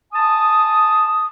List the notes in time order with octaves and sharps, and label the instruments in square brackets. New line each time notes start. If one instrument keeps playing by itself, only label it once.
[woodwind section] G#5 A5 D#6